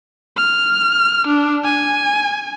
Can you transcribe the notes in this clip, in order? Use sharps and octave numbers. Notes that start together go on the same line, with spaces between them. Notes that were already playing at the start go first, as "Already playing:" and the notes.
F6
D4
G#5